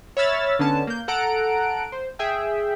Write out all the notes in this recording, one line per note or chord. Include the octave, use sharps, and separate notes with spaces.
C#5 E5 B5 E6 F6 A6
D3 B3 C#4 A5
A#3 G6
A4 F#5 A#5 F#6 D7
C5
G#4 E5 G5